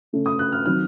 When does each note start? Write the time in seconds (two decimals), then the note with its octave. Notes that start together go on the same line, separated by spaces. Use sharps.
0.13 C#3 A3 C#4
0.26 D#6
0.39 F#6
0.52 F6
0.66 D#3 F#3 C4 F6